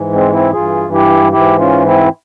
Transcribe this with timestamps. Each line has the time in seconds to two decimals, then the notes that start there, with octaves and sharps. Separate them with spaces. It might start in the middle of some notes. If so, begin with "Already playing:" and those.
Already playing: G#2 E3
0.13 G#3 C4
0.32 C4 E4
0.52 G2 E3 F4 G#4
0.93 E4 G4
1.32 G#2 E3 E4 G4
1.59 C#4 F4
1.85 C4 E4